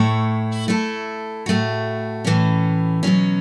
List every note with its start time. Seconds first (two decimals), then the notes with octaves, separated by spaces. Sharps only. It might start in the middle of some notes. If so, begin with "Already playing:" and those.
Already playing: A2 A3 E4 C#5
0.68 A3 E4 A4
1.46 A2 A3 F#4
2.25 A2 E3 C#4
3.03 B2 F#3 C#4